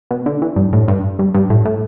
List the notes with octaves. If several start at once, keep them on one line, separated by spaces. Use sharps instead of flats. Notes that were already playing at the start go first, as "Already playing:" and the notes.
B2
D3
E3
G2
A2
G2
G2
G2
A2
A2